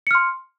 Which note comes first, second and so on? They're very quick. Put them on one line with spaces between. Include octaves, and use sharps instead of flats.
C#7 F6 C6